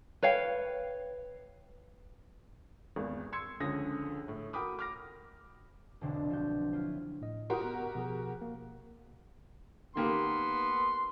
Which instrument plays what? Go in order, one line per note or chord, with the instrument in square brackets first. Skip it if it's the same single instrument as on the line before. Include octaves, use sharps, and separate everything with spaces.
[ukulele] B4 C#5 F5 G5
[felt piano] G#1 E2
C6 E6 G#6 C#7
C#2 D3 F3 C#4 D#6 A#6
A2
F#4 A#4 G5 B5 D6 D#6
D6 F6 A#6
[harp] E1 B1 D3 C4 D4 C5
F3 D4 F#4 G6
F#3 E4 F4 C5
[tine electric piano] A2 D#5
[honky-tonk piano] F#4 G4 A#4 [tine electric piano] C6 D#6
[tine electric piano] B3 A#5
B2 F3 G#4
A#3
[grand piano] D#3 A#3 G4 [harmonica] B3 C6